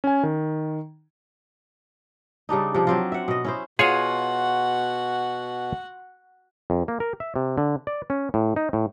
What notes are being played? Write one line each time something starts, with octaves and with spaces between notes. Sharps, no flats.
C#4 G#5
D#3
C#3 G3 D4 D#4
C3 F3
F#3 C4 F4
E5 F#5
B2 D#5
C#4 E4 C5
B2 F4 F#4 G#4 C#5 F5 F#5 G#5
F2
A#3
A#4
E5
C3
D3
D5
C#4
A2
D#4
A2